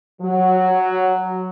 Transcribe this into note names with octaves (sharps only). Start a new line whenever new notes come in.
F#3